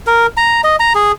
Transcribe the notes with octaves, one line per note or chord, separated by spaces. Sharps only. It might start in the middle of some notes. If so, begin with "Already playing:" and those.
A#4
A#5
D#5
A#5
G#4